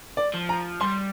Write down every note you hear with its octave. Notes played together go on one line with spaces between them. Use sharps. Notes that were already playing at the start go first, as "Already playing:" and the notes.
D5
F3
A#5
G3 C6